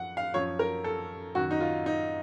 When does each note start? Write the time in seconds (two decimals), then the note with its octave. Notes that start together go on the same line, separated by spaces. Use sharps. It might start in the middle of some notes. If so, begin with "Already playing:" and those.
Already playing: F#2 F3 F#5
0.17 F5
0.34 F#2 F3 C#5
0.59 A#4
0.84 A4
1.35 F#2 D#3 F#4
1.51 D#4
1.60 F4
1.86 D#4